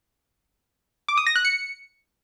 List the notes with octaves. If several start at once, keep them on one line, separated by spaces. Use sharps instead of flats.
D6
D#6
A#6
F#6
C#7